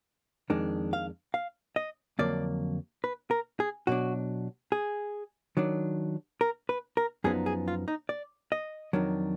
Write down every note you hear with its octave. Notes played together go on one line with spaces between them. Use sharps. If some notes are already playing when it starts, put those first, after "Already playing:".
F2 D#3 G#3 D4
F5
F5
D#5
F2 D3 F#3 A#3 D5
B4
A#4
G#4
B2 F#3 D4 F#4
G#4
D#3 F#3 D4
A#4
B4
A#4
F#2 F3 B3 D#4 G#4
G#4
F4
D#4
D5
D#5
F2 D#3 F#3 D4